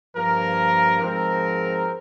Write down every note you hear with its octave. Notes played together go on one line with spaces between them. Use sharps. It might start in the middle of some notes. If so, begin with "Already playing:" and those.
G2 F3 A#3 A#4
G#2 F3 G#3 C4 A#4